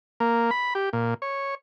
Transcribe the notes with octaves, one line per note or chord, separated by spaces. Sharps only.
A#3
B5
G4
A#2
C#5